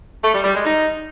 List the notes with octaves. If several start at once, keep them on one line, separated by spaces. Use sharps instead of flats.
A3
G3
G3
G#3
D#4